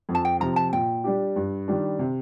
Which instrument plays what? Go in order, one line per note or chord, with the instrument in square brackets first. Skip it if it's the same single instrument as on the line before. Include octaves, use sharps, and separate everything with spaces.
[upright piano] F2
[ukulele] A5
G5
[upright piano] C3 F3 [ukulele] A#5
[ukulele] A5
[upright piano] A#2 [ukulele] G5
[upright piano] G3 D4 G4
G2
D#3 G3 D4
C3